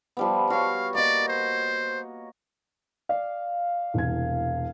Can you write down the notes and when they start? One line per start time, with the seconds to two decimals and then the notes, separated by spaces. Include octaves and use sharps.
0.17 F3 G3 B3
0.50 F#4 C#5 F5
0.95 A#3 D5 D#5
1.28 C5
3.09 D5 F5
3.94 E1 C2 G#6